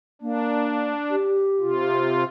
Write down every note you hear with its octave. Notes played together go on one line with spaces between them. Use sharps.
A#3 D4
G4
C3 F4